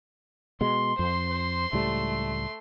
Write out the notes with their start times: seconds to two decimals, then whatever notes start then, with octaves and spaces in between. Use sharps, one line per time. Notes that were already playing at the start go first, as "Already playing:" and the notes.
0.61 B2 G#3 C6
0.99 F2 C5 C6
1.30 C5
1.73 C#2 A2 G3 A3